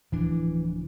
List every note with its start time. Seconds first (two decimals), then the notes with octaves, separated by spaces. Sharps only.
0.12 D1 E3 F3 D4